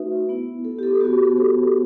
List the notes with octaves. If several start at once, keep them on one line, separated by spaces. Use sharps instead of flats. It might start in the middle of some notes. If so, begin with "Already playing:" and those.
Already playing: A3 D#4 F#4 B4 C5 E5
B3 E4
A4
G4
A4
B3 F#4 G4
A4
A4
C5